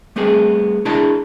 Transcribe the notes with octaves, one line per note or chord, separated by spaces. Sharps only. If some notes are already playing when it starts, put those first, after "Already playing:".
G3 A3 B3 C4 G#4
D4 E4 G#4 A#4 D#5 A5